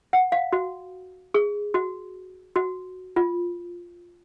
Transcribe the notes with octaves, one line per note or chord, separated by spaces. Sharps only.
F#5
F5
F#4
G#4
F#4
F#4
F4